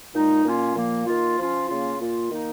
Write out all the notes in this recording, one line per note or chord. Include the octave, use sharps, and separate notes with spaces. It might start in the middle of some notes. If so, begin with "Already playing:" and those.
A#2 G#3 D#4
A#2 A#3 C#4 F4
A#2 F3 A#3
D#3 A#3 F4
F3 C#4 F4
C#3 A#3 C#4 F4
A#2 A#3 F4
D#3 A#3 D#4